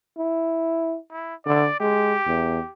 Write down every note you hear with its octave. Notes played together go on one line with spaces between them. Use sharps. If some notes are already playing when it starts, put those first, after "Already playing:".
E4
E4
D3 D5
G#3 G4
E2